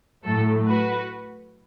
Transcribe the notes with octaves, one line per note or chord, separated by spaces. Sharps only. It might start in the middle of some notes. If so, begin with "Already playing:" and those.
A2 F#3 A3 A4
F#4 B4